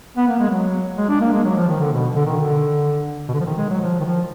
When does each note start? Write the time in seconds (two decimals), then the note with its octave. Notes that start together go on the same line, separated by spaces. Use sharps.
0.17 B3
0.28 A#3
0.39 G#3
0.50 F#3
0.97 G#3
1.09 D4
1.21 A#3
1.32 G#3
1.44 F#3
1.56 F3
1.68 D#3
1.80 D3
1.92 B2
2.16 D3
2.26 D#3
2.36 D3
3.28 B2
3.34 D3
3.40 F3
3.45 D#3
3.57 G#3
3.69 F#3
3.81 F3
4.00 D#3
4.04 F3